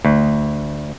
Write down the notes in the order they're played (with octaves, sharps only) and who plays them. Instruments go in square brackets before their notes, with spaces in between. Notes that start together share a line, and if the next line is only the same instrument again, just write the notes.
[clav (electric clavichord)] D2